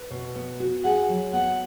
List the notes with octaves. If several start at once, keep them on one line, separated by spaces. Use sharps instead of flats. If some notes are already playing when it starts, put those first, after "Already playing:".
Already playing: B4
B2
B3
F#4
G#4 F#5
F#3
B3 F#5